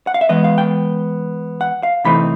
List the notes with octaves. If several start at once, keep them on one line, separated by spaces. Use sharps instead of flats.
F#5
F5
E5
E3 G#3 B3 D#5
F5
G5
F#5
F5
C3 E3 A3 C4 D#4 B5